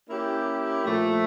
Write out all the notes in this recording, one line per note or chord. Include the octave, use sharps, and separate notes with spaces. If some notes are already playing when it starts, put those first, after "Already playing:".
A#3 C#4 E4 G4
A#2 F3 A3